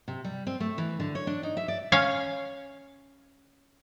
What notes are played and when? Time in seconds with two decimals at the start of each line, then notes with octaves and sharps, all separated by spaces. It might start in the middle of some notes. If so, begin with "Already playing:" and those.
0.08 C3
0.24 G3
0.47 C4
0.60 A3
0.78 E3
1.00 D3
1.15 C#5
1.27 D4
1.43 D#4
1.57 E5
1.68 D5
1.92 C#4 C#5 F5